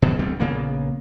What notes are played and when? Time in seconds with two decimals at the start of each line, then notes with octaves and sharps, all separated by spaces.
0.02 B2 D#3 F#3
0.19 E1 D2 G3 C4
0.40 A#1 C#3 A#3 B3